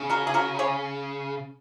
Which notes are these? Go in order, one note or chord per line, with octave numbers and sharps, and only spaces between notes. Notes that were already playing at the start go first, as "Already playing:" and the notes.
Already playing: C#3
F#4 A#4
G#4
F#4 A#4
G#4 C#5